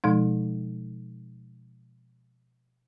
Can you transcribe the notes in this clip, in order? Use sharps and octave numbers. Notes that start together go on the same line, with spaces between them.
B2 F3 G#3 D#4